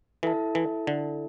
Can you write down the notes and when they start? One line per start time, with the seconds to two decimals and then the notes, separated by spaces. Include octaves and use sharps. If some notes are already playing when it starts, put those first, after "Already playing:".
0.23 E3 E4 A4 E5 A5
0.55 E3
0.87 D3